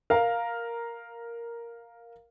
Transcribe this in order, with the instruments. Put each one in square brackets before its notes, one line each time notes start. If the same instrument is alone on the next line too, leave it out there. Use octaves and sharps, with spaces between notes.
[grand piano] A#4 F5